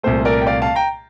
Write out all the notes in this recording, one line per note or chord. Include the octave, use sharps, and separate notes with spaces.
C2 A#2 A3 C5
A#4 D5
G5
D5 F5
F5 A5
G5 A#5